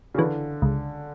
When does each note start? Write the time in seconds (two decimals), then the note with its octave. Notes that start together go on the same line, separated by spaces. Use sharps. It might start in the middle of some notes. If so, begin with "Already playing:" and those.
0.14 C#3
0.18 D3 E3
0.62 C#2